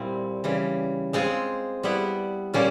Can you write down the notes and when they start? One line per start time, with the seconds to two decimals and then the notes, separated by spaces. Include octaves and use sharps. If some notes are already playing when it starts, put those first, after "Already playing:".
Already playing: A#2 G3 C4 E4
0.44 C#3 E3 G3
1.13 G#3 C4 F4 G#4
1.83 G3 B3 E4
2.53 A#2 G3 A#3 C#4 F4